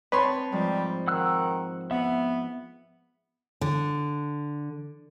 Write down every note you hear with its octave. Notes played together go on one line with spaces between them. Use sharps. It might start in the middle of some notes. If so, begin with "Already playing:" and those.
C4 B4 C#5 A5 C6
G#2 F3 G3
D#3 F#5 E6 F#6
B3 E5 F#5
D3